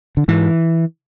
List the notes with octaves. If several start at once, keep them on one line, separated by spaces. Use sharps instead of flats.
D3
G#2 E3